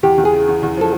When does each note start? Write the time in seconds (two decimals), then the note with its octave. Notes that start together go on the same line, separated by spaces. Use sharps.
0.03 E2 G4
0.18 E2
0.25 G#4
0.32 C#3
0.48 E2
0.63 E2
0.77 F3 A4